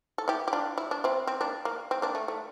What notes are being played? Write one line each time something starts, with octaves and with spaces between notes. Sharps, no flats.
A4
E4 G4
G4
D4 F4
E4
D4
C4 E4
C4
A#3 D4
A#3
C4
A#3 D4
A3
A3